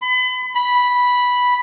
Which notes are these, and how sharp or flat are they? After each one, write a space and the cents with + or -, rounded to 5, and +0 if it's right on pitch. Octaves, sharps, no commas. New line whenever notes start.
B5 +35
B5 -5